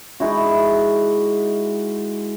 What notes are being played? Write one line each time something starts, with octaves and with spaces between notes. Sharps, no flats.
G#3 D#4 E4 F#4